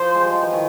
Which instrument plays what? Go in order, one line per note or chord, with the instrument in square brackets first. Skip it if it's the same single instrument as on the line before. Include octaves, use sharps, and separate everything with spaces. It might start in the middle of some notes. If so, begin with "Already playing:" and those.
Already playing: [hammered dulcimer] F3 [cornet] C5
[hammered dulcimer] G#3
G3
F3
E3
D#3